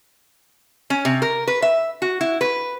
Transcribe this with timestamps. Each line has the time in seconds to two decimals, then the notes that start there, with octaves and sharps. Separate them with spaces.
0.90 C#4
1.05 C3
1.22 A#4
1.47 B4
1.62 E5
2.02 F#4
2.21 E4
2.41 B4